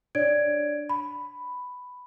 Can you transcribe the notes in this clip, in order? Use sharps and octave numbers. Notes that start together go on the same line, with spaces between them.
D4 C#5 D5 G#6 D7
B5